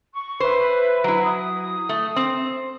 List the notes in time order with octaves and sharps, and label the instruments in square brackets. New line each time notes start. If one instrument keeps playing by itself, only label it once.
[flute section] C#6
[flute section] B4 E5 [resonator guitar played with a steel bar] C5
[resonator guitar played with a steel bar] F#3 E4
[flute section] D#6
[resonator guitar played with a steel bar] A3
C4